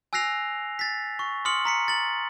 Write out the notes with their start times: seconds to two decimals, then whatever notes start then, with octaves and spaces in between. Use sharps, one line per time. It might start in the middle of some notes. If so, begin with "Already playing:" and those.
0.13 G#5 E6 F#6 A#6 C7 F7
0.79 A6 B6
1.19 C#6
1.45 C6 D#6 F6 C#7 F#7
1.65 A#5 B6 C#7
1.88 A6 F#7